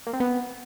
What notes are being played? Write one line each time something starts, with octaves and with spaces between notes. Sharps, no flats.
A#3
C4
B3